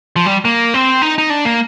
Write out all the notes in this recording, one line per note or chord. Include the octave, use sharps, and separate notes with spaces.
F3
G3
A#3
C4
D#4
D#4
D4
A#3